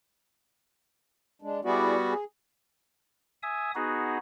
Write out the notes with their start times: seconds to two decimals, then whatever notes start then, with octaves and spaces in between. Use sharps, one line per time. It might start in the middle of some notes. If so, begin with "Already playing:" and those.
1.42 G#3 D4
1.65 G3 B3 E4 F#4 G#4 D5
2.10 G#4
3.43 E5 G#5 D#6
3.75 B3 D#4 F#4 G#4